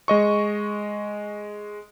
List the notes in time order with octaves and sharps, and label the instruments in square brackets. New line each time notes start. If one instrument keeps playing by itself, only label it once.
[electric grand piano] G#3 D#5 C#6